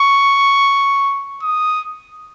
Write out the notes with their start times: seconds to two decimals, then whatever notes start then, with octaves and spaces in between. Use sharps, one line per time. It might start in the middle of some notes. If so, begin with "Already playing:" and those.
Already playing: C#6
1.43 D#6